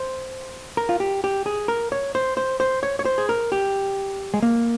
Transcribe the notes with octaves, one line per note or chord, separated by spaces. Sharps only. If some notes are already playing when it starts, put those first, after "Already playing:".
Already playing: C5
A#4
F4
G4
G4
G#4
A#4
C#5
C5
C5
C5
C#5
C#5
C5
G#4
A#4
G4
G#3
A#3